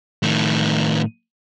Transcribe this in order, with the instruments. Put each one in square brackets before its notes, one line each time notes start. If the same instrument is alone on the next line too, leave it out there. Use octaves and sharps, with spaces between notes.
[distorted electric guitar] A2 D#3